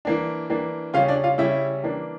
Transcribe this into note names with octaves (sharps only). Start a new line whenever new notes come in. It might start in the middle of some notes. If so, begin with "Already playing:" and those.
E3 A#3 D4
E3 A#3 D4
C#3 G3 C#4 F4 F5
D4 D5
F4 F5
C#3 G3 C#4 E4 E5
E3 A#3 D4